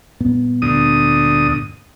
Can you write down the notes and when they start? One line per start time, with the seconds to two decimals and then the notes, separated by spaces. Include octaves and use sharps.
0.20 G2 A#2 B3
0.62 D2 D#6